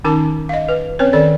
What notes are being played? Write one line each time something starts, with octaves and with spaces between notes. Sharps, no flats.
D#3 C#4 D#4 A#4 A5 D6
D#5 F5
B4
C4 C#4 B4 C#5
D#3 A4 D5